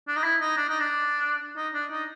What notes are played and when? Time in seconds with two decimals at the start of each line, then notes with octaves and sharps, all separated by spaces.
0.07 D4
0.16 D#4
0.24 E4
0.40 D#4
0.57 D4
0.69 D#4
0.80 D4
1.57 D#4
1.74 D4
1.91 D#4